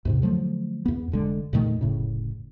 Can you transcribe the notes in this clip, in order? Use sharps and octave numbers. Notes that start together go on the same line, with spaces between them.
D#2 G#2 C3
D3 F3 F#3 A3
E2 B3
F1 D3 G#3
E2 A#2 D#3 A3
F1 A2 C#3